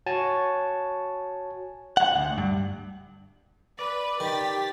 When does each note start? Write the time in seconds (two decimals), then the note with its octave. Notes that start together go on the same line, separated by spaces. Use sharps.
0.06 F#4 C#5 G#5 A5
1.97 F#5
2.16 D2
2.38 G2
3.79 B4 D5
4.20 D#3 G4 A6 B6